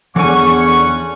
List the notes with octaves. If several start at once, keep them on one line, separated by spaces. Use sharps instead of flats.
E2 D3 E3 C#4 F#5 G#5 C#6